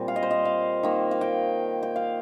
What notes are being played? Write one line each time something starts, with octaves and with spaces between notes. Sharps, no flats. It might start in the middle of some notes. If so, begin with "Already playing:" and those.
Already playing: A#2 G3 C4
F5
D#5
C5
D#5
F5
D#3 A#3
F5
G5
G5
F5